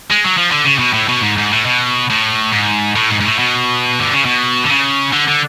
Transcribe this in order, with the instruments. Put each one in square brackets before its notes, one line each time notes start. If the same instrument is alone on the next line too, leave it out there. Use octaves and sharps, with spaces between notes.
[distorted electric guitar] G#3
F#3
F3
D3
C#3
B2
A2
B2
G#2
G#2
A2
B2
A2
G#2
A2
G#2
G#2
A2
B2
D3
C#3
B2
D3
C#3
D3
D3